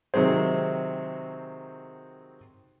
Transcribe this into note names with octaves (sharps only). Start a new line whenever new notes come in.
C3 D#3 F#3 G#3 C4